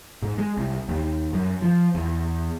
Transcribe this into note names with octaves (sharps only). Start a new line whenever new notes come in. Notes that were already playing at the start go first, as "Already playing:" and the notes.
G#2
G#3
C2
D#2
F#2
F3
E2